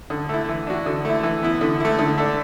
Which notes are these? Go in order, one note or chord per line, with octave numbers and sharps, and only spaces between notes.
D3
A3 E4
E3
D4 F#4
D3
A3 E4
E3
B3 E4
D3
A3 E4
D3
A3 D4